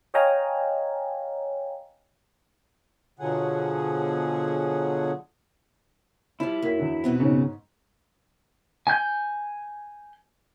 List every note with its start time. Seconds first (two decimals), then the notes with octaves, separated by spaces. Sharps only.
0.14 C#5 D#5 F5 G5 G#5 A#5
3.19 B2 D3 F3 F#3 G#4 F#5
6.40 F3 G3 E4
6.62 F#2 A#3 B6
6.78 E2 D4
7.04 B2 B3 C4
7.20 G#2 C#3 D#4 C#5
8.87 G#5 G6